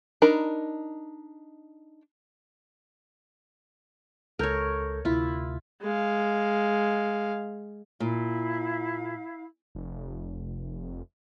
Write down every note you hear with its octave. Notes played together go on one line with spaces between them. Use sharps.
D4 D#4 A#4 B5
C#2 A4 A#4 C#5 G6
D2 C3 E4 F4
G#3 F5
A#2 E4 F5
F1